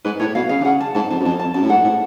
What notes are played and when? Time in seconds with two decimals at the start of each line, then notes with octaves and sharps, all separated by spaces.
0.05 G#2 B4
0.20 A2 C#5
0.35 B2 F5
0.49 C#3 F5
0.61 D3
0.65 C#3 F#5
0.80 A5
0.95 G#2 A5
1.10 F2 A5
1.20 F#2
1.25 F2 A5
1.40 A5
1.54 F#2 A5
1.63 A2
1.70 G#2 F#5
1.84 A2